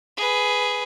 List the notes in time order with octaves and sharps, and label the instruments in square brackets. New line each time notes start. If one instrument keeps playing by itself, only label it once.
[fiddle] G#4 B4